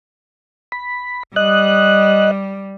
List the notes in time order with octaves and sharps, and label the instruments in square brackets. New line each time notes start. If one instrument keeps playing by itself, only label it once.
[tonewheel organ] B5
[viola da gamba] G3 [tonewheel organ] D#5 F#6